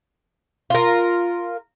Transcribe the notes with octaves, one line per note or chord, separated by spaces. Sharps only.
F4 A#4